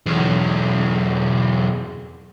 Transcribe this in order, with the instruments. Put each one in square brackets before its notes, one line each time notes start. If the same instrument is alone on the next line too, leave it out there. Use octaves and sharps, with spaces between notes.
[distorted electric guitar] B1 E2